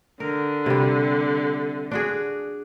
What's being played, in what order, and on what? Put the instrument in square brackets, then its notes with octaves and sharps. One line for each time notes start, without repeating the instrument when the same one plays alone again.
[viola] D3 [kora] A#4
[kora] C3 G3
D4 F#4 G#4